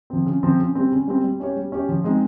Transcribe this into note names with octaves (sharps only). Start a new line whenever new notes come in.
F3 C4
C#3
F3 C4
C#3
G3 C4
C#3
G3 C4
G3
C#4 G4 C#5
G3
C#4 G4 C#5
F3
G#3 C4 D#4